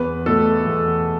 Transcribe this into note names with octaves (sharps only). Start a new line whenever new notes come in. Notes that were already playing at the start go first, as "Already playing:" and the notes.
Already playing: E2 B4
B2 A3 A4
E2